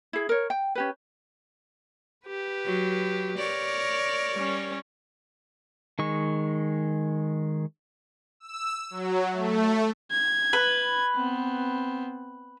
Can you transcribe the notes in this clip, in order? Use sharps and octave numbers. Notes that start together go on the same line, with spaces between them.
E4 G#4
A#4 C#5
G5
C#4 G4 B4
G4 B4
F#3
A#4 C#5 D5
G3 C#4
D#3 G#3 C#6
E6
F#3
A3
G#6
B4
B3 C4